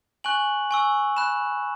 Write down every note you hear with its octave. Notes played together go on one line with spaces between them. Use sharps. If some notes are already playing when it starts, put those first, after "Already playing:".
G#5 C#6 F#6 F#7
G#5 C#6 E6
B5 F#6 E7